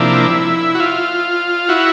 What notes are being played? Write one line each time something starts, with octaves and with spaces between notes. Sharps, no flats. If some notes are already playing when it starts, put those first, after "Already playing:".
Already playing: C3 F3 A#3 D4 E4
F#4
F4
E4 F#4